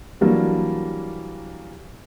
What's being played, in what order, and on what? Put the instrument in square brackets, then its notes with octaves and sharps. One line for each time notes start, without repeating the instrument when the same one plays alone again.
[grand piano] E3 F#3 G3 A#3 D4